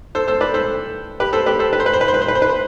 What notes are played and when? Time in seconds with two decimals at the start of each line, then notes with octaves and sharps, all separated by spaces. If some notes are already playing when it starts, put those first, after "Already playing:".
0.15 A4 C5
0.28 A4 C5
0.41 B4 D5
0.54 A4 C5
1.20 G4 B4
1.33 A4 C5
1.46 G4 B4
1.59 A4 C5
1.73 B4
1.80 C5
1.86 B4
1.93 C5
2.01 B4
2.08 C5
2.14 B4
2.22 C5
2.28 B4
2.35 C5
2.42 B4
2.49 C5